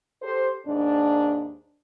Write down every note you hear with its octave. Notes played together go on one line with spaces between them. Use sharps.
G4 A4 C5
D#2 G#2 D4